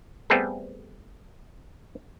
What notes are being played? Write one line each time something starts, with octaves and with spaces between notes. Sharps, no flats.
G3 A3 B3 C4 G#4 A4